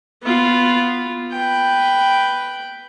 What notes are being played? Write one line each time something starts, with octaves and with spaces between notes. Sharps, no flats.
B3 F4
B4 G5